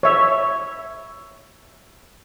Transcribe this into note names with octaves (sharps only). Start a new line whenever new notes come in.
C#5 E5